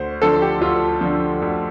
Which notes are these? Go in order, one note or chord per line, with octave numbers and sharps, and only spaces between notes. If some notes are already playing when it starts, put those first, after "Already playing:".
Already playing: D2 C5
D3 F3 A4
G4
D2 F4
D3 F3
D2